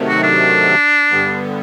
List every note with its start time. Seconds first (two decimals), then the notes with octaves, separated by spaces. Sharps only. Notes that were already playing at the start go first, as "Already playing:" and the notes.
Already playing: C3 D#3 F#3 A3
0.08 F#4
0.23 D4
1.11 G2 D3 G3 B3